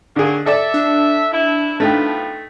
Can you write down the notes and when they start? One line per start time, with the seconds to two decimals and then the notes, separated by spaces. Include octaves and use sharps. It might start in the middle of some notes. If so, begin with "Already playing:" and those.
0.16 D3 D#3 F#3 A#3 G#4
0.46 A4 D5 E5 A5
0.74 D4
1.32 E4
1.80 B2 F3 A3 D#4 B4 G5